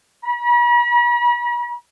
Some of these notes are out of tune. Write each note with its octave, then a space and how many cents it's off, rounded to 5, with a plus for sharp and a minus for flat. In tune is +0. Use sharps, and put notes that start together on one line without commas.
B5 -45